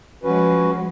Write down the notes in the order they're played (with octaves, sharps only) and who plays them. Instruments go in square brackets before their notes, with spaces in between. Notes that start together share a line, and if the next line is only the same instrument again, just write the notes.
[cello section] F3 G#3 [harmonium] C#4 F#4 B4